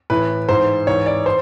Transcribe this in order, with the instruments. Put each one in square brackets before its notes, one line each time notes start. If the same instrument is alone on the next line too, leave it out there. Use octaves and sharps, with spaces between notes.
[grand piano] A2 E3 B4
G#2 E3 C5
G#2 E3 C#5
D5
C5